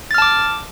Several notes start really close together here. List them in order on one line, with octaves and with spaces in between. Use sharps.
A6 F6 A5 D6